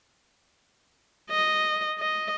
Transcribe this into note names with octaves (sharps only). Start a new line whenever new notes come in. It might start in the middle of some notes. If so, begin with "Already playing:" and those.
D#5
D#5